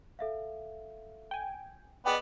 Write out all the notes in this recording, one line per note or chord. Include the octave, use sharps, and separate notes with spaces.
A4 E5 F5
G5 G#5
B3 G#4 D5 D#5 G5